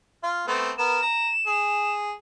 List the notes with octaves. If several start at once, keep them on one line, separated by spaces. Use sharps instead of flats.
F4
A3 B3 C4
B3 A#4 E7
A#5
G#4